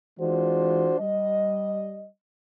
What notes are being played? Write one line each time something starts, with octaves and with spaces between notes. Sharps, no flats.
E3 G#3 D4 F4 F#4 C5
G3 D#5